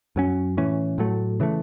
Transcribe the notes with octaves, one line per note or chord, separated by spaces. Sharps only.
F#2 F#3 C#4
A2 E3 C#4
A2 F#3 A3
C#3 E3 A3